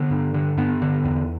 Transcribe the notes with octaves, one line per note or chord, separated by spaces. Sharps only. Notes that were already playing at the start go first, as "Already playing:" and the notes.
Already playing: D3 B3
G2
D3
G2 B3
D3
E2